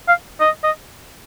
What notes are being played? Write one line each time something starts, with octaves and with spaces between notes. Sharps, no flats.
F5
D#5
D#5